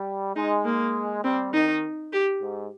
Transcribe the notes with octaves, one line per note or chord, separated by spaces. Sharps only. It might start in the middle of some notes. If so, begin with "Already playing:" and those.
Already playing: G3
G#3 D#4
A#3
G3 C4
D#3 D#4
G4
G#2